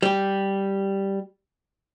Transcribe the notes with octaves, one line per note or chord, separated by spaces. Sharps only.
G3 G4